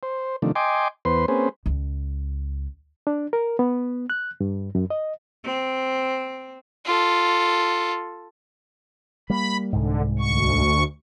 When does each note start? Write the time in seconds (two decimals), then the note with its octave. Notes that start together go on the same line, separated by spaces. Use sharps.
0.03 C5
0.42 C3 D#3 F3 A3 D4
0.55 D#5 G5 G#5 C6 D6
1.05 E2 B3 B4 C5 C6
1.28 A#3 C4 C#4 G#4 B4 C5
1.66 C#2
3.07 D4
3.33 A#4
3.59 B3
4.10 F#6
4.41 G2
4.75 F#2
4.90 D#5
5.44 C4
6.86 F4 A4
9.30 G3 A#3 B5
9.73 C2 G#2 D3
10.19 D2 C#6